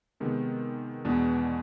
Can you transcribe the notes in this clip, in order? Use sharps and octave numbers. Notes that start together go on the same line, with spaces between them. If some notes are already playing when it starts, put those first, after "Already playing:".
C3 D#3 G#3 B3
E2 B2 G#3 B3 D4